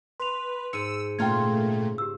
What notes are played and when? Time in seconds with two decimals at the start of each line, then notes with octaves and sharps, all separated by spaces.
0.20 B4 C6 F7
0.73 G#2 E6 C#7 D#7
1.19 A#2 C#3 A3 F4 G5 A#5 G#6
1.98 G4 E6